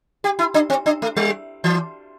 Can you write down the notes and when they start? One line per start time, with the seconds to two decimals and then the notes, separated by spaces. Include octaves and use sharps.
0.24 G4
0.39 E4
0.54 D4
0.70 C4
0.86 D4
1.02 A3
1.16 G3
1.64 E3